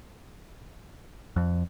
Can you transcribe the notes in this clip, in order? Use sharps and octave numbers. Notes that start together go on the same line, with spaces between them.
F2